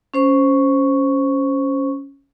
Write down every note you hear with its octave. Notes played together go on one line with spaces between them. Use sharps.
C#4 C5 C#6